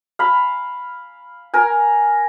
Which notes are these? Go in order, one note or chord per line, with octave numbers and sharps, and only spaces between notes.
F5 B5
A#4 G#5